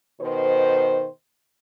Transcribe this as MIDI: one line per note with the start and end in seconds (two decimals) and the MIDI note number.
0.22 1.07 47
0.22 1.07 51
0.22 1.07 72